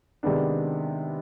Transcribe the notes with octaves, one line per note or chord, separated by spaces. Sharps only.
C3 D#3 G#3 B3 D4